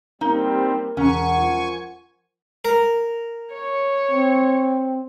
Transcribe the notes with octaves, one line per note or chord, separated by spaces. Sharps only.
G3 A#3 C4 D#4 A#4 G7
E1 C#4 F#5 G#5 A#5 C#6
F3
A#4
C#5
C4